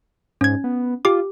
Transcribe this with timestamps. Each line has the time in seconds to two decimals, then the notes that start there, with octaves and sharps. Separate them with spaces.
0.41 G#2 C#4 G#6
0.64 B3
1.05 F4 G4 D6